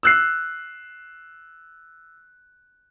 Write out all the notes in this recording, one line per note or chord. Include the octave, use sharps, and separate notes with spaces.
E6 F#6 C7